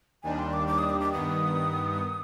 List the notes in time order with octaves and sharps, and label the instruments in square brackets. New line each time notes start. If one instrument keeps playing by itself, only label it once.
[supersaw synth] D#2 D#3 G3 D4 [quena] G#5
[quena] C6
D6
D6
D#6
D6
D6
[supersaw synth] G2 D#3 B3 [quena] D#6